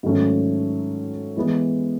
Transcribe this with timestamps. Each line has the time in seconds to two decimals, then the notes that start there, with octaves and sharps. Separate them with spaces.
0.03 G#2 D#3 F#3 A3 C#4
1.37 E3 G#3 B3